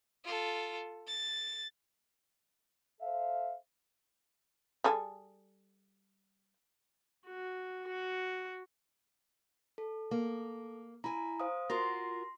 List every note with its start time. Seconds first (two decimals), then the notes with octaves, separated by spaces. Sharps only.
0.24 F4 A4
1.07 A6
3.01 A4 C5 E5 F5
4.84 G3 G#4 A4
7.26 F#4
7.87 F#4
9.78 A4
10.11 A#3
11.04 E4 G#5 A#5
11.40 C5 F5 D#6
11.70 F4 F#4 A#4 C6 A#6